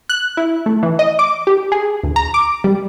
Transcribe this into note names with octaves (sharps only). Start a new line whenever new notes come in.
F#6
E4
A3
E3
D#5
D6
G4
G#4
D2
A#5
D6
G3